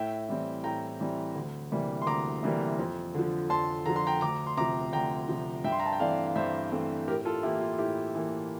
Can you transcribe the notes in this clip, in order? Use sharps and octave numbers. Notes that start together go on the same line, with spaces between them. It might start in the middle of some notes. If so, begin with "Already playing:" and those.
Already playing: A2 E5 G5
E3 G3 C4
A2 G5 A#5
E3 G3 C4
D2
C3 E3 G3 A#3
C6
D2 A#5 D6
C3 E3 G3 A#3
F2
D3 F3
F2 A5 C6
D3 F3 A#5
C6
G5 A#5
D2 A#5 D6
C6
C3 F3 A#5 D6
D2 G5 A#5
C3 F3
G2 E5 G5
C6
A#5
A5
G5
E3 A3 C4 D5 F5
F5
G2 C5 E5
E3 A3 C4
A2 G4 A#4
F4 A4
E3 A#3 E4 G4
F4
A2 E4 G4
E3 A#3